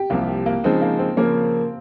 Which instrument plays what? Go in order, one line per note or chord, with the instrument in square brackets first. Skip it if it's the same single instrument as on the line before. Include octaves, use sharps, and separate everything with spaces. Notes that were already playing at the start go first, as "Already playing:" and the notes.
Already playing: [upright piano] G4
[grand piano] C2 C3 F3 [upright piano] A#3
[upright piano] A#3
[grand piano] C#3 F3 G#3 D#4 [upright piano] C4
[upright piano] A#3
C4
[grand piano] C#3 F3 A#3 C#4